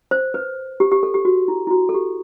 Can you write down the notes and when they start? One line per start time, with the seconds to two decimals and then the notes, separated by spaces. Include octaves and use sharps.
0.11 C5
0.34 B4
0.80 G4
0.92 G4
1.03 A4
1.14 G4
1.25 F#4
1.48 E4
1.67 E4
1.71 F#4
1.89 A4
1.94 G4